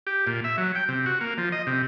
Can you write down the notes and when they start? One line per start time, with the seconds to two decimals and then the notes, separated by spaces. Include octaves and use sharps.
0.07 G4
0.27 A#2
0.44 E5
0.58 F#3
0.75 G5
0.88 C3
1.06 F#4
1.21 A#3
1.38 F3
1.52 D#5
1.67 C3